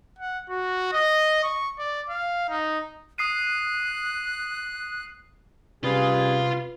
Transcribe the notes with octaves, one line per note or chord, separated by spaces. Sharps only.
F#5
F#4
D#5
C#6
D5
F5
D#4
D#6 F#6 C7 D#7
C3 G3 C#4 F4 G#4 B4